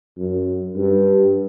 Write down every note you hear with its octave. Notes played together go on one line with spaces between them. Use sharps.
F#2
G2